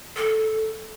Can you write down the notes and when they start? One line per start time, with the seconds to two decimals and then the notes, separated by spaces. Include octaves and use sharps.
0.16 A4